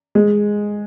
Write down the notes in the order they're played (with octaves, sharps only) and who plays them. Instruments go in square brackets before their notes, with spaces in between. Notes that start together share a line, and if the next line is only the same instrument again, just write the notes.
[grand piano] G#3